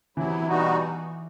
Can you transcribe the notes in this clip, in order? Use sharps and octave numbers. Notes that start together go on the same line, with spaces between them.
C3 E3 F#3 B3 E4
B2 G3 B3 D#4 F#4